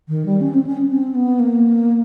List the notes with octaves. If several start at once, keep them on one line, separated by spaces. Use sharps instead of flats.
D#3
G3
C#4
C4
C#4
C4
B3
A#3